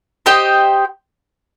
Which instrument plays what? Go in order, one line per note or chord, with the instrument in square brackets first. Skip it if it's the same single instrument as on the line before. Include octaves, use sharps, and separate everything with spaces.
[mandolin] G4 C5 D#5 G5